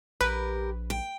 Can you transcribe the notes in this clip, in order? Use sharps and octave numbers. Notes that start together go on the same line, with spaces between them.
A#1 G4 A#4 B4
G5